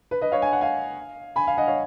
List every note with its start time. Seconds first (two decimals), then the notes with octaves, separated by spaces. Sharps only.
0.11 B4
0.21 B4 D#5
0.32 C#5 F5
0.42 G#5
0.53 F#5
0.61 F5 G#5
1.36 G#5 B5
1.47 F5 G#5
1.58 D#5 F#5
1.67 C#5 F5